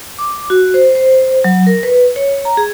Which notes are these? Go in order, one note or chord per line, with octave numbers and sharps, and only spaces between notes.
D6
F#4
C5
C5
F#3
A#4
B4
C#5
A#5
G#4